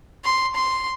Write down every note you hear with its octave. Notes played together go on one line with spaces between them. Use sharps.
C6
C6